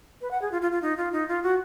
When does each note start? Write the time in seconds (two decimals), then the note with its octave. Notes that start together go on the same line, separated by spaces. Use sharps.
0.21 B4
0.31 F#5
0.42 G#4
0.52 F4
0.62 F4
0.72 F4
0.82 D#4
0.97 F4
1.13 D#4
1.28 F4
1.43 F#4